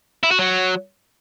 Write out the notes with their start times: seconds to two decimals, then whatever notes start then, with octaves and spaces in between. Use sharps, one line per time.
0.23 E4
0.31 F#4
0.39 F#3